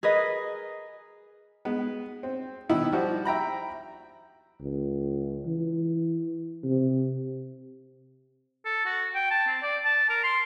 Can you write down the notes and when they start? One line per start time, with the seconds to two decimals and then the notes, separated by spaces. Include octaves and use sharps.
0.03 G#4 A#4 B4 D#5
1.65 G#3 B3
2.23 C4
2.70 B2 D#3 B3 E4
2.92 F3 G3 F#4
3.25 E5 G5 A#5 B5
4.60 C#2
5.46 E3
6.64 C3
8.65 A4
8.86 F#4
9.15 G5
9.31 A5
9.47 C4
9.63 D5
9.85 A5
10.09 A#4
10.24 C6